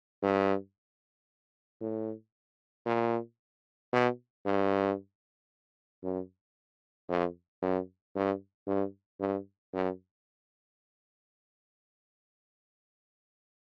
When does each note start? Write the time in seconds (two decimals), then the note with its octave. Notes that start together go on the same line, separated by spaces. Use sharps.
0.22 G2
1.81 A2
2.86 A#2
3.93 B2
4.46 G2
6.03 F#2
7.09 F2
7.62 F#2
8.16 G2
8.67 G2
9.20 G2
9.74 F#2